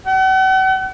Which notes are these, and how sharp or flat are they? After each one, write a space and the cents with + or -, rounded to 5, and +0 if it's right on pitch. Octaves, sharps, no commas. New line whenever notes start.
F#5 +40